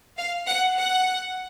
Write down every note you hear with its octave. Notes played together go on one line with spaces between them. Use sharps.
F5
F#5
F#5